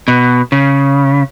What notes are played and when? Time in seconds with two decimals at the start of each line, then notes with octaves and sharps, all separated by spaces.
0.08 B2
0.52 C#3